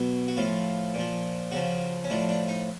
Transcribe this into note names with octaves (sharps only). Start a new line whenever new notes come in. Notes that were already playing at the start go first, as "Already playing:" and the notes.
Already playing: B2 F#3
F#4
A2 F3 F4
A#2 F3
C#3 F3 F#4
C#4
A2 F3 D4
D4
D#4